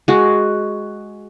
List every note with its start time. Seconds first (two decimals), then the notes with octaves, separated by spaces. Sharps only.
0.08 G#3 F#4